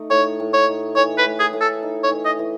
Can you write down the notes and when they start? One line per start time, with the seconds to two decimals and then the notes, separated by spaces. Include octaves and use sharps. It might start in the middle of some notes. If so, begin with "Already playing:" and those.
Already playing: A3 D#4
0.10 A2 C#5
0.40 A2
0.54 C#5
0.68 D#4
0.96 E3 C#5
1.18 B4
1.26 A2
1.40 G#4
1.53 A2
1.61 A4
1.83 D#4
2.04 C#5
2.11 E3
2.25 D#5
2.39 E3